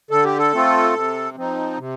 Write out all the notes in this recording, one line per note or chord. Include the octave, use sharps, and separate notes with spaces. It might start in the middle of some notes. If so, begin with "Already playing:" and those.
D3 A4
G4
A4
A3 C4 F4
C3
F3 C4 D#4
C3